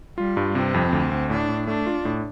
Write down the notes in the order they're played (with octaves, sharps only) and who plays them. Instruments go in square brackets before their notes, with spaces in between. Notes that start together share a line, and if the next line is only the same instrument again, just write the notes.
[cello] G3 [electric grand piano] F4
[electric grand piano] G2
[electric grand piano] C3 [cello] C4
[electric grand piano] F2
D2
D2
[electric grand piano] A2 [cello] D4
[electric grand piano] A2
[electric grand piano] A3 [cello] D4
[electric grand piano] F4
A2